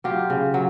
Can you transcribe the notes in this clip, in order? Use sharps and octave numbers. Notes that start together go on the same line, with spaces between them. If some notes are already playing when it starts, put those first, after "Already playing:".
F#3 F4 G4
C#3
F#3